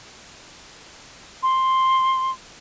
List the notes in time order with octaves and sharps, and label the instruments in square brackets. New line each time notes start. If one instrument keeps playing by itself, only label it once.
[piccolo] C6